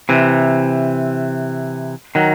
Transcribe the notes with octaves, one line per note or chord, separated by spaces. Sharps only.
C3 E3
D#3 F#3